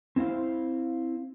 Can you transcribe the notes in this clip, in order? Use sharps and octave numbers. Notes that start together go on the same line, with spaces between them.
C4 E4 C5 F5